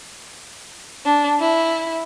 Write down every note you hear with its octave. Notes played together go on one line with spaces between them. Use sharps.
D4
E4